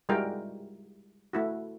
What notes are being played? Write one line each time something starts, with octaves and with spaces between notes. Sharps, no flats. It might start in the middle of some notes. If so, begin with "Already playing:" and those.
G3 G#3 E4 F#4 A#4 G5
A3 E4 F#4